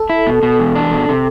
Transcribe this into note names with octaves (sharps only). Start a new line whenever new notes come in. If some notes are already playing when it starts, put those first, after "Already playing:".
Already playing: A4
E4
B2
B2
E2
D4
B2
C3